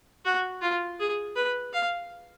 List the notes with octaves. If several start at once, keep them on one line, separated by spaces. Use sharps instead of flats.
F#4
F4
G#4
B4
F5